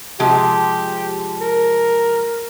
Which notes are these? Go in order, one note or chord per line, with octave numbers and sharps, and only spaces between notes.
C3 F3 G#3 G4
A#4